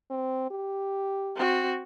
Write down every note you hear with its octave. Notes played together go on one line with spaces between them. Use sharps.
C4
G4
C4 F#4